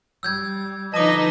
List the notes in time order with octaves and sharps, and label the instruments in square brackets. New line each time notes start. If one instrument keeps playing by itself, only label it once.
[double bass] G3 [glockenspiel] E6 G6 G#6
[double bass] D3 F3 [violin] D#4 B4 [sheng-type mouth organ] D#5 [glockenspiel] A5 D6